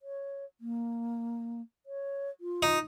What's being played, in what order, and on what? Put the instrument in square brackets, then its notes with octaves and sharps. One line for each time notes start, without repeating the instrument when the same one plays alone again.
[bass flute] C#5
A#3
C#5
F4
[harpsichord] D#4